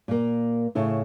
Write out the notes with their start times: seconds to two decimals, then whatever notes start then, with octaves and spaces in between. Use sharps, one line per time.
0.08 A#2 A#3
0.75 A2 C#3 E4